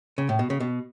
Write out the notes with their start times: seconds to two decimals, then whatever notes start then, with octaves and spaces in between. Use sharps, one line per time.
0.18 C#3
0.29 A2
0.39 B2
0.50 C#3
0.60 B2